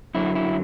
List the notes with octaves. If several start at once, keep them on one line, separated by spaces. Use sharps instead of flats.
F#2 D3 F#3 E4
E4